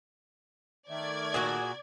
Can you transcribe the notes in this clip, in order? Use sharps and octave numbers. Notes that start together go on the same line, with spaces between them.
D#3 A3 D5 G#6
A#2 F#4 G#4 F#5 G#5